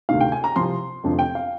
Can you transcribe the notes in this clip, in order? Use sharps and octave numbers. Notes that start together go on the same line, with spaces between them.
D2 C3 D#3 F5
G5
G#5
A#5
C2 C3 F3 C6
F1 F2 D3 F3
G5
F5